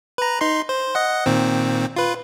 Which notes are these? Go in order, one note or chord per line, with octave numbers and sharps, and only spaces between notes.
B4 A#5
D#4 C6
C5
D#5 F#5
A#2 D#3 C4
F4 B4